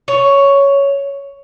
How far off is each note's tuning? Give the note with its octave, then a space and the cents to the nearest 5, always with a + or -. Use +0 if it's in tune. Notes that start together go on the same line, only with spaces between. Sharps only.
C#5 +5